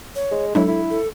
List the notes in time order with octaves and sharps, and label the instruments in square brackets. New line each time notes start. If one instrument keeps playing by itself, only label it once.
[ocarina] C#5
[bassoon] G#3
[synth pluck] F#3 G#3 D4 [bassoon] E4 [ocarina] A4
[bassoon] E4
[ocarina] A4